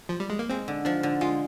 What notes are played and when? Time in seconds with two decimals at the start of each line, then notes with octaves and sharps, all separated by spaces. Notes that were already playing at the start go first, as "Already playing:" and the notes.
0.09 F3
0.20 G3
0.30 G#3
0.39 A#3
0.49 G#3 C4
0.68 D3
0.85 F3 D4
1.03 D3
1.21 G#3 F4